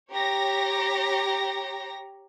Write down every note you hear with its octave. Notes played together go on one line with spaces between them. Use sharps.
G4 C#5 A#5 A#6